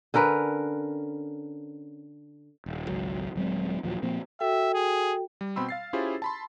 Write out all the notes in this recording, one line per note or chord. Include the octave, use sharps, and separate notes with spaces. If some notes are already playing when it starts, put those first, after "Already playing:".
D3 C#4 A#4 B4
D#1
G#1 C#2 F#3
D#1 F#3 G#3 C4
D#2 A#2 F3 F#3
A#2 F3 A#3 C4
F#4 A4 E5 G5
G#4
G3
B2 C4 G5 B5 C6 E6
F5 A6 C7
C#4 E4 F4 G4 G#4 C5
A5 B5 C6